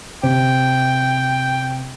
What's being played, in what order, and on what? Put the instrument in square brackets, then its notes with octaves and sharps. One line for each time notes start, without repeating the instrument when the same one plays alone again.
[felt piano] C3 [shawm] G5